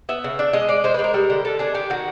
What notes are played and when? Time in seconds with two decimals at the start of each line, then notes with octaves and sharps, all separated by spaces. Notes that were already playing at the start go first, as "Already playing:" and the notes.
0.09 B3 E5
0.24 C#3
0.39 D4
0.53 G#3 D#5
0.68 G#3 D5
0.84 G#3 C5
0.94 B4
0.99 G#3
1.04 A#4
1.14 G3
1.30 D3
1.45 D3 A4
1.59 D4 G#4
1.74 D#3 G4
1.90 D#3 F#4